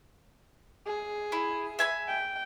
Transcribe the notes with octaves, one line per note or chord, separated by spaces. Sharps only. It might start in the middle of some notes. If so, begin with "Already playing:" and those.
G#4
E4
E5 G#5 B5
G5